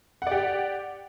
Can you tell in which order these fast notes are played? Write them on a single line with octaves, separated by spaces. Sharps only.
F#5 D5 G4